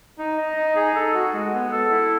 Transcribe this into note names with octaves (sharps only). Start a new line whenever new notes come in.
D#4
D#5
D#4
G#4
A4
F#4
G#3
B3
A4
E4